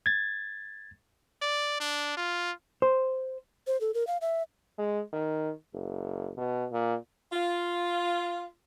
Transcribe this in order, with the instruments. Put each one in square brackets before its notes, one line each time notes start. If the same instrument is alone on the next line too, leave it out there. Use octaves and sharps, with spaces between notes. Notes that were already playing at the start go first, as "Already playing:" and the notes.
[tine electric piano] G#6 A6
[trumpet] D5
D4
F4
[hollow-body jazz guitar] C5
[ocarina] C5
A4
A#4
F5
E5
[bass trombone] G#3
D#3
F#1
B2
A#2
[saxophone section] F4